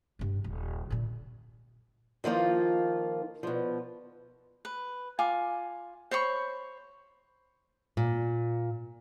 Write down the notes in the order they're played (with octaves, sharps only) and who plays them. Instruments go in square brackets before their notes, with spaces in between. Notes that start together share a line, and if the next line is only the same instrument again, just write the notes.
[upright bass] G2 D4
D#1
A#2 D3
[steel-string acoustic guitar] D#3 F3 A#3 F4
B2 F3
[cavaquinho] B4
F4 G#5 D6
C5 C#5 B5 C#6
[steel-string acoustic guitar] A#2